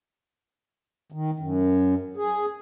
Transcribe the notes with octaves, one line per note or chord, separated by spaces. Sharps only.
D#3
F#2
G#4